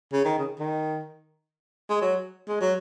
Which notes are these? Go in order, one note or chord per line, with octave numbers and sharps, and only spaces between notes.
C#3
D#3
C#3
D#3
G#3
F#3
G#3
F#3